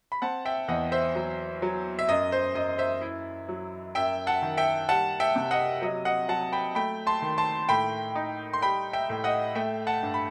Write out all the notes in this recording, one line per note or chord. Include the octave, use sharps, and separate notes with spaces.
B5
C4 F#5 A5
E5 G5
E2 D#5 F#5
C5 E5
F#3
F#3
E5
F#2 D#5
C5
F#2 D#5
C5 E5
E4
F#3
F#2 E5 G5
F#5 A5
D#3
E5 G5
G3 F#5 A5
E5 G5
C3
D#5 F#5
F#3 D#5
D#5 F#5
F#3 F#5 A5
G5 B5
A3 G5 B5
A5 C6
D#3
A5 C6
A2 G5 B5
D#4
C6
G3 G5 B5
E5 G5
A2
D#5 F#5
A3 E5 G5
F#5 A5
G2
B5